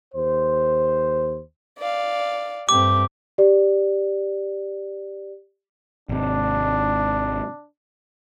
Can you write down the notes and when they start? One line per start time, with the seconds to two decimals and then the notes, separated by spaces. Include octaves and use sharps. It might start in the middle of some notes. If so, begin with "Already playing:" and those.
0.14 D#2 C5
1.78 D5 F5
2.69 G2 A3 C4 G4 D6
3.38 G4 D5
6.09 G#1 C3 D4